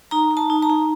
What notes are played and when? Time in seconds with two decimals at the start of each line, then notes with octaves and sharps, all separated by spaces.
0.11 D#4 A#5
0.31 D#4
0.37 A5
0.50 D#4
0.62 A#5
0.70 D#4